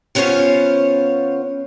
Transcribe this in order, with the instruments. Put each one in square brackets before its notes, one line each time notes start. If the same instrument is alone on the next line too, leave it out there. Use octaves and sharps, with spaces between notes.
[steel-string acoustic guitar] C#3 B3 C#4 F4 C5 C#5